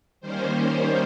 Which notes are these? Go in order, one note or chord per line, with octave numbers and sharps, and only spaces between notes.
D#3 G3 A#3 C#4 C5